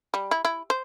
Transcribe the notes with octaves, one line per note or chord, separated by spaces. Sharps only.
G3
E4
E4
C5